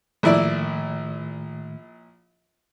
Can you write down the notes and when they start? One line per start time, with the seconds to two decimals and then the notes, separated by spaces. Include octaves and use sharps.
0.23 A#1 A2 D#3 A3 E4 D5